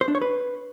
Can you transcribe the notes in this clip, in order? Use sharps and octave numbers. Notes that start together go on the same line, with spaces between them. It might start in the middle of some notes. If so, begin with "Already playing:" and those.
C5
D4
C#5
B4